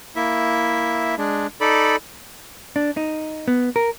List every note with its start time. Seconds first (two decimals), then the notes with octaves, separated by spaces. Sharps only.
0.16 A#3 E4 E5
1.18 G#3 D4
1.61 D#4 A4 D5 B5
2.76 D4
2.97 D#4
3.48 B3
3.76 A#4